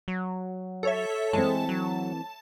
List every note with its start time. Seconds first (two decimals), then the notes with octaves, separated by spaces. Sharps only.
0.08 F#3
0.83 A4 C#5 E5
1.33 E3 G#3 A3 C4 A5
1.69 F#3